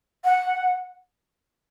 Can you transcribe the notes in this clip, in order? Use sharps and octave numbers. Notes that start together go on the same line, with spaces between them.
F#5